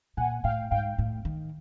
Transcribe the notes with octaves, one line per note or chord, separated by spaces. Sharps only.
A#2 F#5 G#5
A2 F5 G5
G#2 F5 G5
A2
D#3